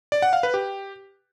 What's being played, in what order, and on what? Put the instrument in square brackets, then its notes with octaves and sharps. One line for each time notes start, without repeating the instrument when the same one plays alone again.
[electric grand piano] D5
F#5
F5
B4
G4